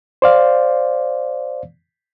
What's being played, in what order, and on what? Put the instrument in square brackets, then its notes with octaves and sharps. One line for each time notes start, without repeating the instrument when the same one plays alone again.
[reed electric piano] C5 D5 F5